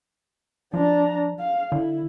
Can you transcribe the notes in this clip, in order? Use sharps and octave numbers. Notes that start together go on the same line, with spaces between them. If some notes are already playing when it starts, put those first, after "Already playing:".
F3 D4 A#5
F5
D3 E4